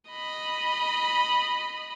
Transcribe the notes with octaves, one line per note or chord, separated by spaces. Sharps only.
D#5 B5